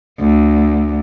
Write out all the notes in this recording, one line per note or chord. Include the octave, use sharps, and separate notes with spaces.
D2